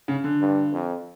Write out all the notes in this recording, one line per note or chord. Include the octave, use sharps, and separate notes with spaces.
C#3
D3
G2
F2